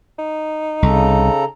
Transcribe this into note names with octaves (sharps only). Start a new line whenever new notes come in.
D#4
C2 C#3 A4 A#5